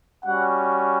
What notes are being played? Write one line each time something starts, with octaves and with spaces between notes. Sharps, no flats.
G3 C#4 F#4 F#5